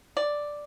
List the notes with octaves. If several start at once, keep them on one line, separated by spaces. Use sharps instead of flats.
D5